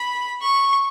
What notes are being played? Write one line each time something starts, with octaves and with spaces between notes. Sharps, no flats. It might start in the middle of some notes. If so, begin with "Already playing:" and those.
Already playing: B5
C#6